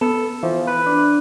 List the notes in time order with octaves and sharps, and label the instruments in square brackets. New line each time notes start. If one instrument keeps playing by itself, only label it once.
[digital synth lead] B3 [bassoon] A4
[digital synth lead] E3 [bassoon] F3
[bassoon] B4
[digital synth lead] D4